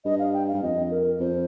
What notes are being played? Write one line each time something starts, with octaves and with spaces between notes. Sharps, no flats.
G2 D#5
F5
G5
F5
G2
F2 D#5
A#4
F2 C5